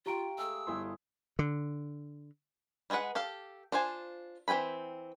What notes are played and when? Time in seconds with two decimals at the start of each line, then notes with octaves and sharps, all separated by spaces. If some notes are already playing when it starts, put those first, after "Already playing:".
0.06 F4 G4 C#5 F5 G5 A#5 D7
0.38 G#3 A3 G#4 E6
0.67 G1 E4 C5 D#5 G#5 C6
1.39 D3
2.90 G3 G#3 G#4 B4 F#5
3.15 G4 A4 F5
3.72 D4 F4 C5 G#5
4.48 E3 C4 G5 G#5 B5